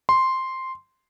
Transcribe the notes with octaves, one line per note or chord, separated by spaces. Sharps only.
C6